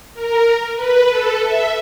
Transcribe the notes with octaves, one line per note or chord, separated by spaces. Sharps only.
A#4
B4
A4
E5